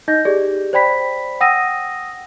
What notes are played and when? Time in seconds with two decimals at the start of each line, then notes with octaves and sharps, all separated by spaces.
0.08 D#4 D#5 G6 A#6
0.25 G4 G#4 D5
0.73 C5 D5 G5 B5 B6
1.41 F#5 G5 D#6 E6 A#6 D#7